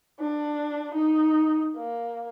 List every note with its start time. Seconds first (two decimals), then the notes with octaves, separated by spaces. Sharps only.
0.20 D4
0.94 D#4
1.77 A#3